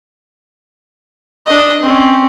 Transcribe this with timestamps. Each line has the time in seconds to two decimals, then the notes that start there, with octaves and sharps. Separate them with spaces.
1.46 D4 D#5
1.82 C4 C#4